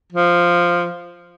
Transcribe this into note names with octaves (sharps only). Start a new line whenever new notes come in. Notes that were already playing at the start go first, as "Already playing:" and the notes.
F3